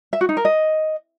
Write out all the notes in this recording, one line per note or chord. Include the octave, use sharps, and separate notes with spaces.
E5
F#4
D#4
A#4
D#5